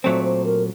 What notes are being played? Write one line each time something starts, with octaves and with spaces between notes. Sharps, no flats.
A#2 F#3 A3 C4 C5
C5
A#4